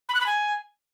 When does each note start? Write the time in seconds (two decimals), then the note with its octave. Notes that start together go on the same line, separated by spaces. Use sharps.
0.09 B5
0.15 F#6
0.20 B5
0.26 G#5